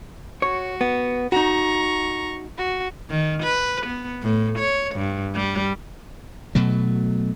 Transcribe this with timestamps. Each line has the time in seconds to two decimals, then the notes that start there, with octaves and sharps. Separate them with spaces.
0.42 F#4 C#5
0.81 B3
1.32 D#4 F#4 A#5 C#6
2.58 F#4
3.10 D#3
3.43 B4
3.86 B3
4.22 A2
4.59 C#5
4.95 G2
5.34 G3
6.55 B2 F#3 A3